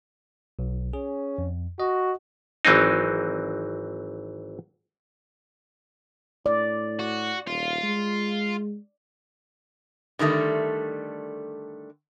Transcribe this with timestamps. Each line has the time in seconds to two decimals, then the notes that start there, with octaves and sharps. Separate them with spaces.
0.59 B1
0.93 C#4 G#4
1.38 F2
1.80 F#4 D#5
2.65 G#1 E3 F#3 C4 D#4
6.46 A2 D5
6.99 F#4
7.47 D#1 F4
7.83 G#3
10.19 D3 D#3 G3 A3